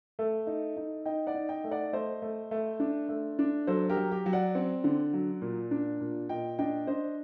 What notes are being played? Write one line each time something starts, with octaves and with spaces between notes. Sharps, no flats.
A3 A4
D#4
D#4
D#4 D#5 G5
D5 F#5
D#4
D#5 G5
A3
D5 F#5
A3 C5 D#5
A3
A3
D4
A3
D4
F#3 A4 C5
G4 A#4
F#3
G4
F#3
D5 F#5
C4
D3
F#3
A#2
D4
A#2
A#2 D#5 G5
D4 D#5 G5
D4 C5 D#5